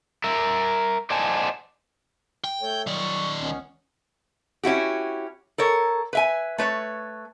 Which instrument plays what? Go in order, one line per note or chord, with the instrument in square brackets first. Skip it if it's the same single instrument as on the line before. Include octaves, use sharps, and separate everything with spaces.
[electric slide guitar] A#4 E5
C5 D5 D#5 F#5 G#5 A5
[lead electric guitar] G5
[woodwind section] A3 A4 C#5
[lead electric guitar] D#3 D5 [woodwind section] F#3 C#6
[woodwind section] C#2 B3 C#4
[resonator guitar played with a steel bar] C#4 E4 F#4 G4
A4 A#4 C#5
B4 E5 G#5
A3 B4 C#5